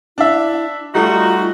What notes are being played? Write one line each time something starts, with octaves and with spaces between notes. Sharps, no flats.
D4 E4 E5
G3 A3 D#4 F4 F#4